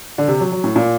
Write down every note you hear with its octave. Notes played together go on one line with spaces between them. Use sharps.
D3
C3
F#3
F#3
A2
A#2